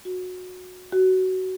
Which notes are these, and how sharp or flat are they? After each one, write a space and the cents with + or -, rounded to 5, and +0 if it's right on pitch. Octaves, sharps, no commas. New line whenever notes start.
F#4 -20
F#4 +15